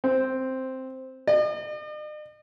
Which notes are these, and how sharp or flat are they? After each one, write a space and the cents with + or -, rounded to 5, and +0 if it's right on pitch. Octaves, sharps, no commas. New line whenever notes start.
C4 +0
D#5 -45